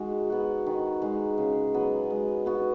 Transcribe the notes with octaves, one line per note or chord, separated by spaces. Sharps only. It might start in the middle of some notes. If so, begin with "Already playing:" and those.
Already playing: D#3 G#3 D#4 F#4
B3 F#4
D#3
G#3 D#4
C#3
F#3 B3
G#3
B3 F#4